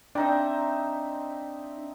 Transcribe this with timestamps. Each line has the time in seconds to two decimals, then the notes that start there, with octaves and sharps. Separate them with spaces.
0.15 C4 D4 D#4 E5